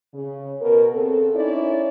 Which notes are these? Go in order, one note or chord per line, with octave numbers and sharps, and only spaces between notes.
C#3
B2 A#4
C#3 C4 A4
C#4 D#4 E4 C#5 D5